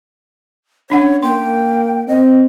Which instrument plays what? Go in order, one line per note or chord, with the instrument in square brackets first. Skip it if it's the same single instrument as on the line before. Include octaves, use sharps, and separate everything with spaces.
[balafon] C#4 D4 F#5 [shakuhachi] C#5
[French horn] A#3 [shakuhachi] G5 [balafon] C6
[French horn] C4 [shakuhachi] D#5